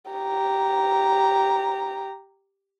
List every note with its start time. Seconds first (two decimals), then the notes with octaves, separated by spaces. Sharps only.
0.11 G4 A#5